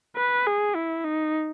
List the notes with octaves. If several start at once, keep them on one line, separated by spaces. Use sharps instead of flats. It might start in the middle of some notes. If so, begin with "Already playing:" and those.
B4
G#4
E4
D#4